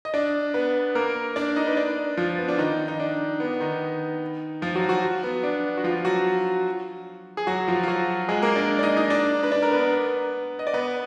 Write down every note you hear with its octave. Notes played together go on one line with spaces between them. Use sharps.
D#5
D4 D5
B3 B4
A#3 A#4
D4 D5
D#4 D#5
B4
D4 D5
F3 F4
B3
D4
D#3 D#4
D#4
D4
B3
D#3 D#4
F3 F4
F#3 F#4
F#3 F#4
B3
D4
F#4
F3 F4
F#3 F#4
G#4
F#3 F#4
F3 F4
F4
F#3 F#4
G#3 G#4
A#3 A#4
D4 D5
D5
D#4 D#5
D#4 D#5
D4 D5
B4
D4 D5
A#4
B3 B4
D#5
D5
B3 B4